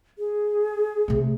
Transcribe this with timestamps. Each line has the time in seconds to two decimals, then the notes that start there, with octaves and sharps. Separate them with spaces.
0.18 G#4
1.08 C3 A3